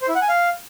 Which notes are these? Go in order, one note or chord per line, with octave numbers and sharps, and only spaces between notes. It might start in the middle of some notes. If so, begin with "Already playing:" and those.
C5
E4
F#5
G#5
F5